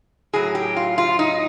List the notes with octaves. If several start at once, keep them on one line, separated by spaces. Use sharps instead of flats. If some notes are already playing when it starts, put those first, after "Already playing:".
A2 F#3 G#4
G4
F4
F4
D#4